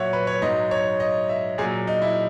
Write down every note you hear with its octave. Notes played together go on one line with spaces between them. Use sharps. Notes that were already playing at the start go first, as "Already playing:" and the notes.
Already playing: A#2 F#3 C#5 E5 F#5
B4
C#5
G#2 F#3 D#5
C#5
D#5
E5
A#2 F#3 G#4
D#4
E4